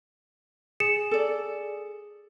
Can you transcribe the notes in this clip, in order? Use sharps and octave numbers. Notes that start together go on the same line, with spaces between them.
G#4 C#7 E7
A4 D5